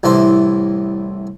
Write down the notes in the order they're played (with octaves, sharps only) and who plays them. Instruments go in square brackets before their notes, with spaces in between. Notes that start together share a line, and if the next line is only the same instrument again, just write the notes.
[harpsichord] C2 A2 E3 D4 C5